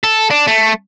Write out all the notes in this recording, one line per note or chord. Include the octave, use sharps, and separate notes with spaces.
A4
D4
A3